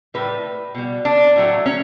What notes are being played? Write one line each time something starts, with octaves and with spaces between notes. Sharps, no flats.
A2 G3 B4
B2 G3
D4
A2 F#3 A3
C#4